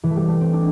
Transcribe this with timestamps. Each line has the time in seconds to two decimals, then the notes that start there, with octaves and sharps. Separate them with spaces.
0.03 E3
0.11 A3
0.16 G3
0.28 A3
0.41 C4
0.53 D4